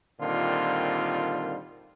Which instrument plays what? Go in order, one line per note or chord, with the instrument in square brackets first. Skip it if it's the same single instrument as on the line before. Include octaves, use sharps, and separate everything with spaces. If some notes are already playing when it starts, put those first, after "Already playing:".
[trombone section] A#2 D3 D#3 G3 C4 F4